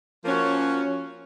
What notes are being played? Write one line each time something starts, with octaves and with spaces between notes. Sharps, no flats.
F3 A#3 C#4 F#4